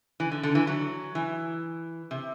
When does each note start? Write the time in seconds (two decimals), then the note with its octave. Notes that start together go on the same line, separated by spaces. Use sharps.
0.20 E3
0.32 D3
0.43 D3
0.55 E3
0.67 F#3
1.15 E3
2.11 C3